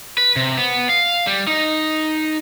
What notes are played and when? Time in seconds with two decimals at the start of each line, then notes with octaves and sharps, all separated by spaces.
0.18 B4
0.36 C3
0.57 B3
0.89 F5
1.27 G3
1.47 D#4